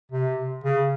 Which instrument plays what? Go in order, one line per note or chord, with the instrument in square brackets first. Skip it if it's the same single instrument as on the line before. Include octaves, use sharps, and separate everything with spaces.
[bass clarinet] C3
C#3